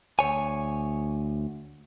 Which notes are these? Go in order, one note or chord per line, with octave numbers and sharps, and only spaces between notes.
D2 C#5 G#5